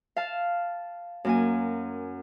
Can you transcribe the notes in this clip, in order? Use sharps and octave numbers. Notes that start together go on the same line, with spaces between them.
F5 A5
F#2 A#3 G#5